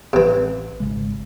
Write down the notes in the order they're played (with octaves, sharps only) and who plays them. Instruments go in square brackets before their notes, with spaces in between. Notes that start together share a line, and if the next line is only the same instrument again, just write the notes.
[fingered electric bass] A1 [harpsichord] C3 E3
[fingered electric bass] G#1 C#3 G#3